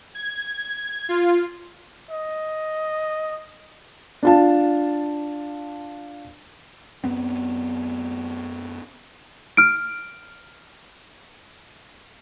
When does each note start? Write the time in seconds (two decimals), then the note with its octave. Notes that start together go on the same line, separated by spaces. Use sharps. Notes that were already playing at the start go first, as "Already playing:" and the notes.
0.15 G#6
1.09 F4
2.11 D#5
4.23 D4 F4 A5
7.04 F#2 B3 C4
9.57 F6 D7